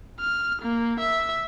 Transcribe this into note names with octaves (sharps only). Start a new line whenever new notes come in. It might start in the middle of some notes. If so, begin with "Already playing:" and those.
F6
A#3
E5